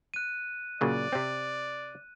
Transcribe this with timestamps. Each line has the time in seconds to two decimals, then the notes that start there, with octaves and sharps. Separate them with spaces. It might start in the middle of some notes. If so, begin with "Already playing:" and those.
0.14 F#6 D#7
0.81 A#2 C#3 F#3 D5
1.12 C3 C4